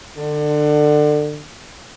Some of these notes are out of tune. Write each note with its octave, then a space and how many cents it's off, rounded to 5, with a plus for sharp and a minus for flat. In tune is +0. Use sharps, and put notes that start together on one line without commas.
D3 +25